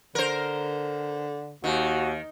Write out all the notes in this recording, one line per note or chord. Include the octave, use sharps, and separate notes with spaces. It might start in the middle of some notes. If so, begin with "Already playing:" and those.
D3 A#4 C5
D#2 D#3 F#4